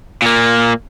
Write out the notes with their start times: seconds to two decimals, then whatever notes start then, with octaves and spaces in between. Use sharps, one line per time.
0.22 A#2 A#3